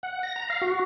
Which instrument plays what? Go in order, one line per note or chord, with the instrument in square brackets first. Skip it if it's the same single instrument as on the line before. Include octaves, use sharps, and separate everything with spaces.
[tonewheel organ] F#5
A#6
A#5
F5
F#4